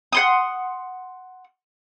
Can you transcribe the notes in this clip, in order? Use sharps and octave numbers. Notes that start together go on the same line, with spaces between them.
F#5 C6 D#6